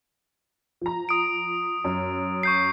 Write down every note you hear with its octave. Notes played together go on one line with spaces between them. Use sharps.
F3 A#5
D#6 D7
F#2
C#6 G6 C7